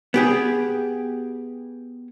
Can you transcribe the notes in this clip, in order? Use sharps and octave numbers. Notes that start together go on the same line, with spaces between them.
B3 G4 G#4